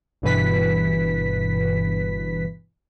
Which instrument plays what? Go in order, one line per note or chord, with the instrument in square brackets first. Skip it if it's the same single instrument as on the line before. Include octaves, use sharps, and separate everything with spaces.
[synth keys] G1 G2 B2 E3 B4 B6